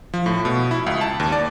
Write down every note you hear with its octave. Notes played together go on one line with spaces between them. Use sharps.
F3
A2
B2
E4
C#2
A5
D#2
D5